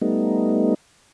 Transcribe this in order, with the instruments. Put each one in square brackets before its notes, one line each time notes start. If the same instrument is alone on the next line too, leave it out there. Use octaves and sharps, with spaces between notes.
[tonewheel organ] G3 A3 B3 D#4